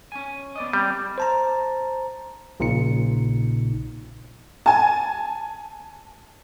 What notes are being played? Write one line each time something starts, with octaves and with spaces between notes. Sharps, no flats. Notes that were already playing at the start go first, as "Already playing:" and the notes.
C#4 G#5
B3 D5 D#5
G3 C4 G5
C5 A5 A#5
A#1 A#2 C#3 D#4 C#7
G#5 A5